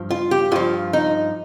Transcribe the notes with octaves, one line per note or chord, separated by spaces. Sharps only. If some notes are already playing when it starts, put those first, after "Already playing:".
Already playing: G2 F3
F4
G4
G2 F3 F4
D#4